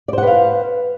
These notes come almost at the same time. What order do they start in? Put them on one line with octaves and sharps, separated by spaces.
D5 C5 F#5 B4 F5